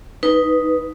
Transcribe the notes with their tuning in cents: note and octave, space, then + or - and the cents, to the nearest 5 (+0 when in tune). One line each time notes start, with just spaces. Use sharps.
D#4 +0 B4 +0